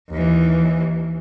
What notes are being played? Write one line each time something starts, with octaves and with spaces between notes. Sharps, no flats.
D#2 E3